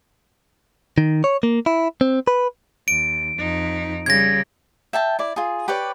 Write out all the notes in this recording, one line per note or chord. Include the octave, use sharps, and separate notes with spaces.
D#3
C#5
A#3
E4
C4
B4
D#2 D7
F2 D#4
C#3 G3 G#6 A#6
E5 G5 A5
E4 D5
F4 G#4
G4 B4 C#5 D5